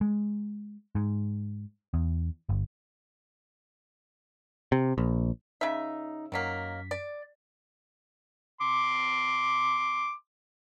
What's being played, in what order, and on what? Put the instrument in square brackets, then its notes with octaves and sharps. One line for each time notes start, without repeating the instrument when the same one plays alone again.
[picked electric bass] G#3
G#2
E2
G1
C3
A#1
[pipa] C#3 E5 [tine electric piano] D#4
[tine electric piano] F#2 B6 [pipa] D#3 F#3 A#3
[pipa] D5
[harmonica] C6 D6